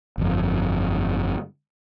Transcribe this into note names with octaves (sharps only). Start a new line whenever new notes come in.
G1 F2